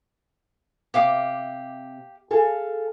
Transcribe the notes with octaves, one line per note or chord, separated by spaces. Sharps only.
C3 G4 F5 D6
G#4 A4 F5